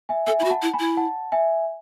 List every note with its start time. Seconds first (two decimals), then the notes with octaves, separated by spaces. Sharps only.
0.09 E5 G#5
0.27 A4 E5 G#5
0.40 E4
0.42 F#4 B5
0.50 F#5 A5
0.62 E4
0.73 G#5 B5
0.79 E4
0.97 F#5 A5
1.32 E5 G#5